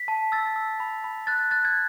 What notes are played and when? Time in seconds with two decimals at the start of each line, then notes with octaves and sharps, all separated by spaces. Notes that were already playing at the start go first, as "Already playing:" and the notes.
Already playing: B6
0.08 A5
0.32 E6 A6
0.56 E6
0.80 B5
1.04 B5
1.27 F#6 A6
1.51 F#6 A6
1.65 G#6